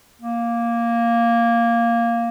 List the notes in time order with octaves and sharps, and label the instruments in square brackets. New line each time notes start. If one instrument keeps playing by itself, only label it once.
[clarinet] A#3